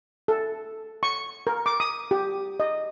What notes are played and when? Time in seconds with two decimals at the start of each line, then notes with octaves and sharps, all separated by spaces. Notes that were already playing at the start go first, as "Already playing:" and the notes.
0.28 A4
1.03 C#6
1.47 A#4
1.66 D6
1.80 D#6
2.11 G4
2.60 D#5